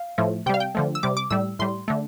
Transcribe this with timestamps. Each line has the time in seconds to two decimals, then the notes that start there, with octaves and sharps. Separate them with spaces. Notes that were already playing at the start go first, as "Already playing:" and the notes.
Already playing: F5
0.18 A2 F3 A3
0.46 C3 G5
0.49 G3 F5
0.60 G5
0.75 D3 F3 A3
0.95 E6
1.03 C3 G3 D6
1.17 D6
1.30 A2 G3 E6
1.59 A2 G3 C6
1.88 D3 A3